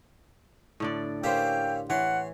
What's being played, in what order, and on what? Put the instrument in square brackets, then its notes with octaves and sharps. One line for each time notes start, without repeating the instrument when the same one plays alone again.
[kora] A2 D3 D5
[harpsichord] A#3 C#4 E5 [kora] G4 C5 [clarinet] G5
[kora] E3 [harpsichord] C#5 C6 [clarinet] F#5